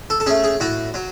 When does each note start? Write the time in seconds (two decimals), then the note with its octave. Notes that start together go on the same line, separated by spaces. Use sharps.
0.10 A4
0.20 A4
0.26 A3 C#4 G#4
0.44 G#4
0.60 A2 F#4
0.94 F#3